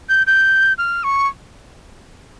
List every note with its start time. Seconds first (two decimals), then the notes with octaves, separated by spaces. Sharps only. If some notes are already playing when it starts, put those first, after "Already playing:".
0.09 G6
0.27 G6
0.78 F6
1.04 C#6